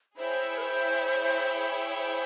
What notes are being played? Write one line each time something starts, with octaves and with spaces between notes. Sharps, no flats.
E4 G#4 C5 C#5 E5 G5
A#4
C5
C5